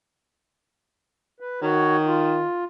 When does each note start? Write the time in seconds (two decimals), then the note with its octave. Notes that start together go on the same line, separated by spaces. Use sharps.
1.40 B4
1.62 D#3 F#4 C#5
2.06 F4